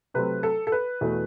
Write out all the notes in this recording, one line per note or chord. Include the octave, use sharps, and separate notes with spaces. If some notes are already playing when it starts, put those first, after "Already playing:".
C3 F#3 A3 C4 B4
A4
A4
B4
E2 B2 A3